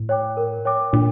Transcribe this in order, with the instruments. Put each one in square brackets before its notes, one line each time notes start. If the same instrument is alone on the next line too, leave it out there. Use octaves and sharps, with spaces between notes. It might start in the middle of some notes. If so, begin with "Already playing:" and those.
Already playing: [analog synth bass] A2
[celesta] C#5 G5 D6
A#4
C#5 G5 D6
[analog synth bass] A#2 [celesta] D4